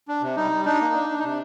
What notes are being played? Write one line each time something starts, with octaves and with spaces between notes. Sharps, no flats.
D4
C3
G3 D#4
G3
D4 D#4
A#3
D4
D4
D#4
C3 D4